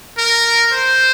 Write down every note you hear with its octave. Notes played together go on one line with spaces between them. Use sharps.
A#4
C5